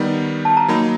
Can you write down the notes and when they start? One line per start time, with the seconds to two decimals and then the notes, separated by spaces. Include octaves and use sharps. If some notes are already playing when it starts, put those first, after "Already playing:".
Already playing: D#3 G3 B3 D#4
0.45 A5
0.57 A#5
0.68 F#3 A#3 D#4 B5